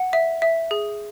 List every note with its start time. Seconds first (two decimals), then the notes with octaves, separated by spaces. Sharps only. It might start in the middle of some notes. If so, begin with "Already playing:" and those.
Already playing: F#5
0.13 E5
0.42 E5
0.71 G#4